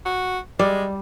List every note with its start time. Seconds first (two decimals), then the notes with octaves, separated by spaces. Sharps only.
0.06 F#4
0.59 G3 G#3 D5